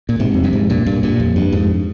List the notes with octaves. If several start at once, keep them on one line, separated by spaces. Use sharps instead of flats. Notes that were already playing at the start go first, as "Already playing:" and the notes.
A#2
G#2 C3
F2
G2
F2 G#2
G2 A#2
G2 A#2
G2 A#2
F2
G2
F2 G#2